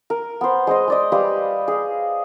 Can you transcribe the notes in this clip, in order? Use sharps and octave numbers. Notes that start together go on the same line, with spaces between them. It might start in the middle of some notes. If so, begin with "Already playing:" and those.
A#4
B3 C5
G#3 C5 D#5
G#3 D5 D#5
G3 G4 B4 F5
G#4 F5